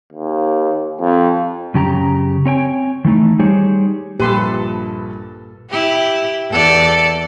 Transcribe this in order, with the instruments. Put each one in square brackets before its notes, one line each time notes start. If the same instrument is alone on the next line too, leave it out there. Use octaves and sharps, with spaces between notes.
[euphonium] D#2
F2
[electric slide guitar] F#2 C#3 G4 A5 A#5
C4 C#5 G5 G#5
D#3 E3 A3 D#4
G3 D#4 G4 G#4 C5 C#5
[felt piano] A#1 G2 [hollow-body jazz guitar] A#2 [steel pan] G4 C6 [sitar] A4 B4
[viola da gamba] E4 G4
E2 A4 D5